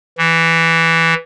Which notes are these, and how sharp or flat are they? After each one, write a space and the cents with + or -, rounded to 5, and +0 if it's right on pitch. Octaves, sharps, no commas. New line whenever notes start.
E3 +0